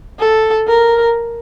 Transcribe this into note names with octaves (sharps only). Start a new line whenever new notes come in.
A4
A#4